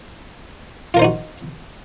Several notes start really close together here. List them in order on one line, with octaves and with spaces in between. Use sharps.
F4 A#4 C5 D#4 F#4